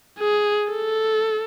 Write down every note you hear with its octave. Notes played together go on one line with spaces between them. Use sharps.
G#4
A4